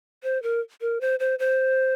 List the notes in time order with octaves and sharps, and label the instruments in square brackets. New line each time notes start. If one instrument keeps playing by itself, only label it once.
[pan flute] C5
A#4
A#4
C5
C5
C5